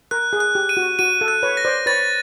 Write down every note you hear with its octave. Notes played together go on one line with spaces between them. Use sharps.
A#4 F#6
G#4
F#6
G4
D#7
F#4
F#4 D#7
A4
F#6
B4 C#5
A#6
C5 D5
B4 C#5 A6